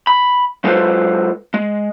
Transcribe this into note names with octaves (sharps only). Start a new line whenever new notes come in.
B5
F#3 G#3 F4 A4 B4 C5
G#3